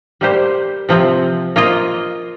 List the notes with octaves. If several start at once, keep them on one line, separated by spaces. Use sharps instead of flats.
G3 A#3 G4 C5
C3 F3 C4
A#3 F4 D#5